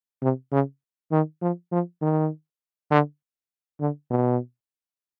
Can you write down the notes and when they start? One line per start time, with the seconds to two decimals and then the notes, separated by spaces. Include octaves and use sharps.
0.22 C3
0.52 C#3
1.12 D#3
1.42 F3
1.72 F3
2.02 D#3
2.91 D3
3.80 D3
4.11 B2